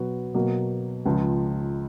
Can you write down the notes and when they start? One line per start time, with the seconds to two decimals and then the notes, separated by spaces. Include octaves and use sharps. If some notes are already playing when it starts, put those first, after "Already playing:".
Already playing: B2 F#3 B3 F#4
0.34 B2 F#3 A#3
1.05 C#2 C#3 F3